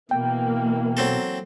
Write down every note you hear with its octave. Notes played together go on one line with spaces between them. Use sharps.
B2 E3 A#3 G5
F#3 C4 A4